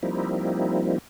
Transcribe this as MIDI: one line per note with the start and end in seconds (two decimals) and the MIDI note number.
0.03 0.98 53
0.03 0.98 55
0.03 0.98 58
0.03 0.98 60
0.03 0.98 63
0.03 0.98 64